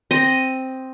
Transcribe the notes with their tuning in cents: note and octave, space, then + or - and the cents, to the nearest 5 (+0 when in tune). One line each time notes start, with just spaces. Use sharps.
C4 +0 D#5 +0